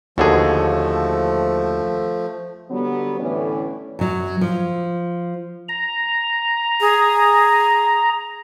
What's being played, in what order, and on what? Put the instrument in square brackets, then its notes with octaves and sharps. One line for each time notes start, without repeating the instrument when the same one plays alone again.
[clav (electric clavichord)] D#2 D3 G#4 [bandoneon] F3 A3 [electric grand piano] F#4 A4
[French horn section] D3 F#3 G3 B3
A2 D3 E3 C#4 B4 D5
[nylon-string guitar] F#2 F#3
F3
[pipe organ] A#5
[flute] G#4